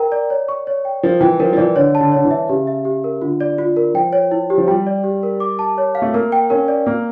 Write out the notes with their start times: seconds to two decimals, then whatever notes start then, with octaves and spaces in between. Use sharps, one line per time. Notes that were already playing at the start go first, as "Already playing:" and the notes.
Already playing: A#4 G5 A#5
0.12 D5
0.30 C#5
0.48 C#6
0.67 C#5
0.85 G5
1.03 F3 A#4
1.21 E3 G5
1.40 F3 A#4
1.53 F3
1.57 E3 D5
1.76 D3 C#5
1.95 A5
2.01 D3
2.12 D3 C#5
2.25 E3
2.31 E5
2.49 C#3 G4
2.67 E5
2.85 G4
3.04 A#4
3.22 D3 F4
3.41 D5
3.58 F4
3.76 A#4
3.94 F3 G5
4.13 C#5
4.31 E4
4.50 G4
4.58 F3
4.67 G3 G5
4.87 D5
5.04 G4
5.23 A#4
5.40 D6
5.59 A5
5.78 C#5
5.95 F5
6.02 A3
6.14 A#3 A#4
6.32 G5
6.50 C#4 A#4
6.68 D5
6.86 A#3 A#4